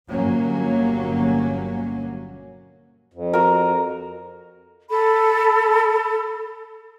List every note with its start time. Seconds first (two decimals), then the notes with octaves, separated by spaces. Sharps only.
0.10 G1 B2 F#3 A#3 C#4
3.13 F2
3.33 F#4 A#4
4.90 A4 B5